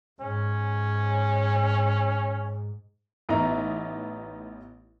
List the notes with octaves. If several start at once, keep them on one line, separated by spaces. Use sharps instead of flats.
G#2 C#4
A1 B3 D#4 D#5 E5 A#5